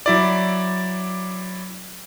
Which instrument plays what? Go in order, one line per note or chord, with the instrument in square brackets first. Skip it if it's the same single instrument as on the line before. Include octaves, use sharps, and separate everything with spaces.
[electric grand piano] F#3 E4 D5